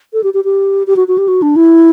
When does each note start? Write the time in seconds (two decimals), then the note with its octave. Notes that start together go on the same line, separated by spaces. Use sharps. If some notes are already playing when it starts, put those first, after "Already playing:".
0.13 A4
0.23 G4
0.34 G4
0.44 G4
0.87 G4
0.96 F#4
1.08 F#4
1.18 G4
1.28 F#4
1.42 D4
1.56 E4